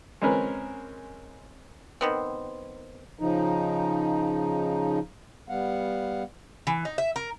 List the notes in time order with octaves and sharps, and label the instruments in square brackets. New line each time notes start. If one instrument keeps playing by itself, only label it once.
[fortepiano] G#3 C4 C#4 A#4 B4
[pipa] D#3 B3 C4
[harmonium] C#3 F3 D#4
G3 B3 F5 F#5
[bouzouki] E3
D#4
E5
A#4